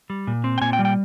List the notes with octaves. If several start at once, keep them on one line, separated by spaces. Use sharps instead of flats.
G3
A#2
C4
G5
A#2 G#5
G5
G3
G5